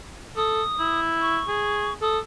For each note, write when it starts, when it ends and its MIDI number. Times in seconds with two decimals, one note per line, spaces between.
0.37 0.62 69
0.37 1.00 87
0.79 1.41 64
1.21 1.94 85
1.48 1.94 68
2.02 2.19 69
2.02 2.19 87